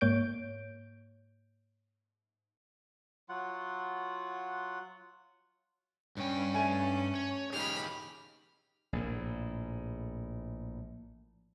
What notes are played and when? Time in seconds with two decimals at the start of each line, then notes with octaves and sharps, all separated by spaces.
0.01 G#2 A#3 C#5 G6 D7
3.29 F#3 F4 F#5
6.17 G2 C#4 G5
6.54 A3 G#5
7.15 C#5
7.53 D#4 G4 G#4 B5 F6
8.93 A#1 A2